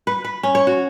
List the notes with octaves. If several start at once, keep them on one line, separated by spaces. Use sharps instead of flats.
B4
B4
C#4
C#5
F#4